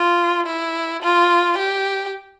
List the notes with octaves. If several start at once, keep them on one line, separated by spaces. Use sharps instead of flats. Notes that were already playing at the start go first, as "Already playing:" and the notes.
Already playing: F4
E4
F4
G4